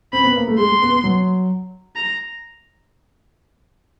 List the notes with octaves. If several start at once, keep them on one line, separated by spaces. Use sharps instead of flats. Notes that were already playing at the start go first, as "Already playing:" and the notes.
C4 B5
B3
A#3
A3
G#3 C6
G#3
B3
B3
F#3
A#5